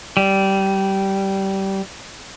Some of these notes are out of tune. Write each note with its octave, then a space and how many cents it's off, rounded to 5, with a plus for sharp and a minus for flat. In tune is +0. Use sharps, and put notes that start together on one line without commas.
G3 -15